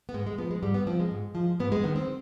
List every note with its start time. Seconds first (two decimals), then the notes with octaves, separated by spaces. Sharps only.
0.09 B3
0.14 G#2 G#3
0.27 G#3
0.38 F3 B3
0.51 G#3
0.63 G#2 G3
0.74 B3
0.87 F3 C4
1.00 G#3
1.11 G#2
1.35 F3
1.60 G#2 B3
1.72 G#3
1.84 D#3 B3
1.96 C4